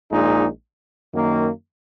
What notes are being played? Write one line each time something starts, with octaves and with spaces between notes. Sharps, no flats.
A#1 A#2 G#3 D#4
F#2 D#3 A#3